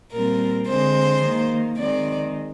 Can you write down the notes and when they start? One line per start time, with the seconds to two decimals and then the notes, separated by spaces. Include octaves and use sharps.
0.12 A#2 G3 C4 A#4
0.67 D3 G#3 C4 C5
1.22 D#3 A#3
1.77 D#3 G#3 C4 D5